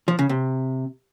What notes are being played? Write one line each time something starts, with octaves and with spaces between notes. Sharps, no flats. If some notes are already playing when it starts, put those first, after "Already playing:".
F3
C#3
C3